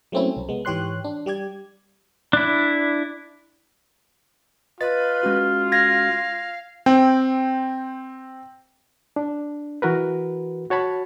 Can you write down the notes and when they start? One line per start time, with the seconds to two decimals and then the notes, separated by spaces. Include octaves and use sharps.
0.12 F#3 A3 A#3 C4 C#4 E4
0.37 C2
0.49 G#3 B3
0.65 G#2 E3 G4 C#5 C6 F#6
1.04 D4
1.26 G3 G4 D5 G#6
2.33 D4 E4
4.81 F4 B4 D#5 A6
5.23 G#3 C#4 F#4
5.72 F5 G#6 A#6
6.86 C4 G5
9.16 D4
9.82 E3 F#4 A#4 B4
10.70 F#4 C#5 A5 B5